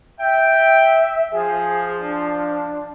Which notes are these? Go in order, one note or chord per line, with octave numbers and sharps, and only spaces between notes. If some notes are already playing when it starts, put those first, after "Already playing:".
E5 G5
F3 G#4
D4